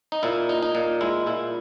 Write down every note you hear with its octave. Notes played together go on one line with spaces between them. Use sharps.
D#4
A#2 E4
D#4
D#4
A#2
G#3 E4
A#2 E4